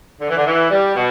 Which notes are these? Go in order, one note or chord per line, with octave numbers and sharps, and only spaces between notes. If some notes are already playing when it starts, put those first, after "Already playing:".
D3
E3
D3
E3
G3
B2